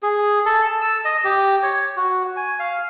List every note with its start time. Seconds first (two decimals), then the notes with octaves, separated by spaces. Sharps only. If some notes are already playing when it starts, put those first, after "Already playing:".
0.03 G#4
0.45 A4
0.65 A5
0.81 E6
1.05 D#5
1.24 G4
1.63 C#5
1.97 F#4
2.37 G#5
2.60 F5